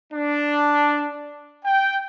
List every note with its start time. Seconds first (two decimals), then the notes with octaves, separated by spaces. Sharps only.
0.13 D4
1.65 G5